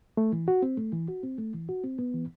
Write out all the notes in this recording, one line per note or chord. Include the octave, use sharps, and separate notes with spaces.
A3
E3
F#4
C4
A3
E3
F#4
C4
A3
E3
F#4
C4
B3
E3